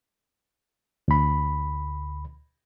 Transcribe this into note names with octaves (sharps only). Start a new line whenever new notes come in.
D2 B5